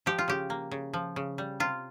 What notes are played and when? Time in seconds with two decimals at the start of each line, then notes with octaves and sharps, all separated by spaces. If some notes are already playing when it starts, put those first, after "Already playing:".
0.06 F3 G4
0.19 F4
0.28 C#3 G4
0.50 A#3
0.71 C#3
0.94 F3
1.16 C#3
1.38 G3
1.60 C3 F4